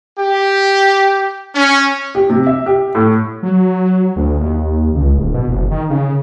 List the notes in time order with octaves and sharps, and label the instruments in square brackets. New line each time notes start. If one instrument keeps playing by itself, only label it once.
[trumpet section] G4
C#4
[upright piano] G4
C3
E5
G4
A2
[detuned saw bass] F#3
D2
D#2
C#2
D1
B2
F#1
D#3
C#3